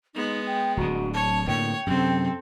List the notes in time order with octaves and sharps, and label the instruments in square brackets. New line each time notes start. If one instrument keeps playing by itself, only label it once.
[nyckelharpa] G#3 B3 [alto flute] D#4
[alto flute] G5
[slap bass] D1 D3 [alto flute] F#4
[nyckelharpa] C#5 [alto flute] A5
[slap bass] A2 D3 A#3 [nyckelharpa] C#5 [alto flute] G5
[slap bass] F#2 C3 [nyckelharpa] C4 A4